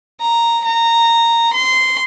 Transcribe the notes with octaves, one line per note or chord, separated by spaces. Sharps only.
A#5
A#5
C6